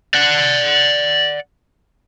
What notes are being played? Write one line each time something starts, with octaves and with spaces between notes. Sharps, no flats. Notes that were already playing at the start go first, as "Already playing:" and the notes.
D5 F#5